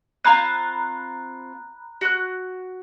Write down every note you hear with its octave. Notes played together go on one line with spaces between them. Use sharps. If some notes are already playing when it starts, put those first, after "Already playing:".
C4 F4 A#5 B5 F#6
F#4 F#6